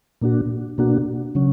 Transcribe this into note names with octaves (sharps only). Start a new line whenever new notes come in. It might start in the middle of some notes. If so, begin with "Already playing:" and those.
A#2 A#3 D4 F#4
B2 A#3 D4 F#4
C#3 F#3 C#4